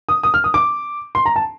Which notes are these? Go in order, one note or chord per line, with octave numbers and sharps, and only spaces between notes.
D#6
D#6
F6
D#6
D6
C6
A#5
A5